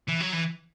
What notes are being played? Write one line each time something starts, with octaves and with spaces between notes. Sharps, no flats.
E3
F#3
E3